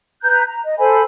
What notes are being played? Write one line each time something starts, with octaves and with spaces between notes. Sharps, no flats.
B4 A#5 F#6 G6
A#5
D#5
A4 C5 G#5 B5